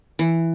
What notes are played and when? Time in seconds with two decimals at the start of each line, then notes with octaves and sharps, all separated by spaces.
0.19 E3